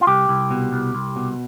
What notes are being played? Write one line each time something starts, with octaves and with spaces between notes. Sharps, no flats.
F4
C2 G4
C2
B2
C2
C2
B2